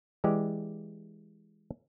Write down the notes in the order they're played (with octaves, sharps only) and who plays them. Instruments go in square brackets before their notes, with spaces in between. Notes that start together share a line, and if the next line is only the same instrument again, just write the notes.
[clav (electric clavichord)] E3 G#3 G4 D5